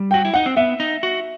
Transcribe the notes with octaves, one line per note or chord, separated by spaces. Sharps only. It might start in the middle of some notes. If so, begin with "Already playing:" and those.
Already playing: G3
F#4 G5
E4
D#4 F#5
C4
B3 E5
D#4
F#4